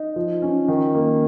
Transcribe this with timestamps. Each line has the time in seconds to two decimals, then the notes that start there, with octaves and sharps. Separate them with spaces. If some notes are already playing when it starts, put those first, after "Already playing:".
Already playing: D#4
0.16 F3
0.42 C#4
0.68 D#3
0.95 A#3